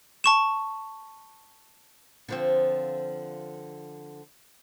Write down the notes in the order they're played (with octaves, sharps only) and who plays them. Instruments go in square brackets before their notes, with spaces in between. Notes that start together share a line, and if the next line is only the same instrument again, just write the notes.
[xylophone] A5 C#6 E7
[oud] D3 F3 C4